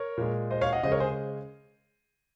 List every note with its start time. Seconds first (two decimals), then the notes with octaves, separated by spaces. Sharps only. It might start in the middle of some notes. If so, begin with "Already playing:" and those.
Already playing: A#4 C#5
0.17 A#2 G#3
0.50 C5 D#5
0.61 C#5 F5
0.73 D#5 F#5
0.83 C#3 G#3 C5 D#5
0.92 A#4 C#5
1.00 G#4 C5